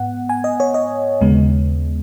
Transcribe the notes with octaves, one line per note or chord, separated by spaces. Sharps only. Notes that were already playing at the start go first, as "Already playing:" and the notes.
Already playing: G#2 B3 F#5
G#5
D#5
C#5
D#5
D#2 C#3 G#3 B3